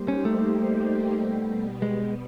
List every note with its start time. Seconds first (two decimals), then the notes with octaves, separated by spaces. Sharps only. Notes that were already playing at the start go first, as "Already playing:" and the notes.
Already playing: G3 A#3 D#4 G4 C5
0.08 C#4
0.25 A3
1.12 B2 G3 B3
1.82 G#3